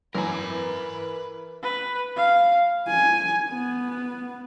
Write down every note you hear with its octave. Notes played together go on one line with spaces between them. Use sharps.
F#2 E3 A#4 B4 G#5
B4
F5
G#5
B3